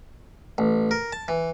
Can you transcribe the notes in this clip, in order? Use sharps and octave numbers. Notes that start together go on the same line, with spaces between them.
A1
A#4
A5
E3